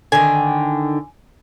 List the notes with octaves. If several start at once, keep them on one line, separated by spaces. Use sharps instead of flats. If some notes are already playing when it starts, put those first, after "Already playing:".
D3 D#3 G#5